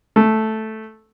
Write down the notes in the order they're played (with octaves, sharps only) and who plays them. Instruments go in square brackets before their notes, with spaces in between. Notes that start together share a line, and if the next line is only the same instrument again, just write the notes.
[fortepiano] A3